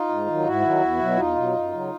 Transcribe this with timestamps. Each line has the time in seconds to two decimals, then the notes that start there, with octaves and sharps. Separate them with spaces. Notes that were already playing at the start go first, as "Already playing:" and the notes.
Already playing: D#4 F4
0.09 G#2
0.26 D#3 F#3
0.44 G#2 E4 F#4
0.62 D#3 F#3
0.81 E2
0.99 B2 F#3
1.17 E2 D#4 F4
1.35 B2 F#3
1.54 F#2
1.72 C#3 F#3